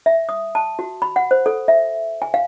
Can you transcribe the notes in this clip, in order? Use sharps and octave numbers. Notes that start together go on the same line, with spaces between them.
E5
D#6
A5
F#4
B5
F#5
C5
A4
E5
G#5
F5